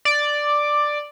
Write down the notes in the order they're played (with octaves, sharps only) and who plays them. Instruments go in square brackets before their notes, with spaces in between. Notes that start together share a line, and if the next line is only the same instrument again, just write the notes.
[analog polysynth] D5